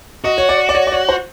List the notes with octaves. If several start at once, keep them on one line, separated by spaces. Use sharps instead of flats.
F#4 D#5
C#5
D5
D5
C#5
D5
C#5
C5